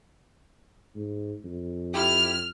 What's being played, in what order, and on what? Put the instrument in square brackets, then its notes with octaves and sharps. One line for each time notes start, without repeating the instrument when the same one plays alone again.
[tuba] G#2
F2
[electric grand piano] E4 G4 [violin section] F6